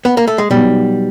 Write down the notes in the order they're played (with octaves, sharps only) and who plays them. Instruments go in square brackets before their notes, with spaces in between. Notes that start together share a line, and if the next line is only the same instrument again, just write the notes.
[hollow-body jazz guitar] B3
A#3
A3
G#3
[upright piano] B2 F#3 B3 D#4 [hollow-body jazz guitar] G3